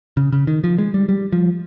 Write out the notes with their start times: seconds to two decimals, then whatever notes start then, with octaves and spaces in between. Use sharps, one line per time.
0.17 C#3
0.32 C#3
0.47 D#3
0.64 F3
0.78 G#3
0.94 G3
1.09 G3
1.32 F3